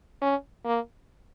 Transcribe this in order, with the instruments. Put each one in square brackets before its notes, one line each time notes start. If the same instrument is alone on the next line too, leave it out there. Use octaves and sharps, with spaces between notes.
[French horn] C#4
A#3